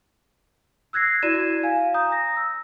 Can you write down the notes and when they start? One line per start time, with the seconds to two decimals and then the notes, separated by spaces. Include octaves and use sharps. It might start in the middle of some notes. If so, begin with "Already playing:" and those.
0.93 E6 F#6 G#6 A#6 C7
1.23 E4 F#4 D5 G#6 D#7 E7
1.63 F5 G#5
1.94 A#5 D#6 G6
2.12 A#6
2.37 E6